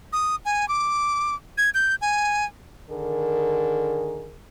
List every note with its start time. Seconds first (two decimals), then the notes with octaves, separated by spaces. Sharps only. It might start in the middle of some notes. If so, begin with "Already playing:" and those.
0.13 D#6
0.45 G#5
0.68 D6
1.58 G#6
1.74 G6
2.01 G#5
2.90 D3 D#3 G#4 A#4